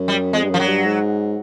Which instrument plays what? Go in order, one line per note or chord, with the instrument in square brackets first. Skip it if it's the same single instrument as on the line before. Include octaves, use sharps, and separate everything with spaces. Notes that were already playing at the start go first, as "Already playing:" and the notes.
Already playing: [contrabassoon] F#2
[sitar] G3
[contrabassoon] F2 [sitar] G#3
[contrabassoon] G2
[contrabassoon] F#2 [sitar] F3
[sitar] F#3
[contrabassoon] G2
G#2